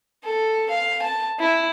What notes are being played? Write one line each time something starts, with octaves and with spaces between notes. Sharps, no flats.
A4
F5
A5
E4